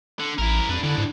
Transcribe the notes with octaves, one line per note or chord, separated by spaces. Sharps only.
D3
A1 E4 A#4
F2 D4 B4
D3 E3 D4
G#2